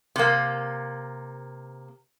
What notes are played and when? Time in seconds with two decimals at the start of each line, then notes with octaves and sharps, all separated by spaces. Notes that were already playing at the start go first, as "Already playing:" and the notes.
0.16 C3 A#3